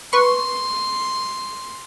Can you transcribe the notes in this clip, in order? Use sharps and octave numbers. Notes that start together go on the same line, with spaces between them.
B4 C6 C#6